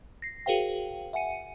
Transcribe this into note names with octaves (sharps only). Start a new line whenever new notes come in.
A#6 C7
F#4 G#4 A#4 C5 F5 G5
E5 F#5 G#5 C#7 D#7